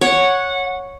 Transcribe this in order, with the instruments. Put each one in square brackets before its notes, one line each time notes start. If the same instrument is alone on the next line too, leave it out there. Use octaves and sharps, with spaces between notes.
[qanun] C#5 [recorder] F#5